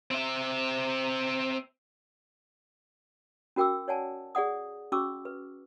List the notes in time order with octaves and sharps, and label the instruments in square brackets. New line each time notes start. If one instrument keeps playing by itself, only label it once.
[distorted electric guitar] C4 E5
[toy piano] C#4 F#4 A#4 G5 D6 E6
C#5 D5 F#5 G#5 A5
G#4 D5 F#5 D#6
C#4 F#4 C#6 D6 E6
B4